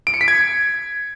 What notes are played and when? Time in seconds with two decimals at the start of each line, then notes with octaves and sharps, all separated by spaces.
0.07 D7
0.14 C#7
0.21 B6
0.28 G#6